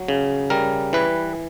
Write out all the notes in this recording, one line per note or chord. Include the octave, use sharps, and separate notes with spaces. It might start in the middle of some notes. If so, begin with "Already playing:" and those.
Already playing: F#3
C#3
G3 A#4
E3 B4